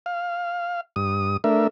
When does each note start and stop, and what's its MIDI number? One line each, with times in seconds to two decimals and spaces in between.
0.06 0.81 77
0.96 1.37 43
0.96 1.37 87
1.44 1.67 57
1.44 1.67 62
1.44 1.67 70
1.44 1.67 76